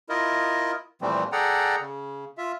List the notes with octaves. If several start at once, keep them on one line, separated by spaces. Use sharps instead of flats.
E4 F4 A#4 D#5
A#2 E3 F3 G3 A3 C4
G#4 A4 D5 F#5 G5 A#5
C#3
F4 E5